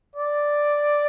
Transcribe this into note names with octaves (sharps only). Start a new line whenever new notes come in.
D5